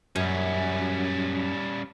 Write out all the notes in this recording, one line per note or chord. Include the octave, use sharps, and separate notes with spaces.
F#2 G3 C#4